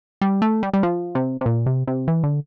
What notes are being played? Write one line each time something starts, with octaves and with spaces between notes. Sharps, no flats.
G3
A3
G3
G3
F3
C3
C3
A#2
C3
C3
E3
D3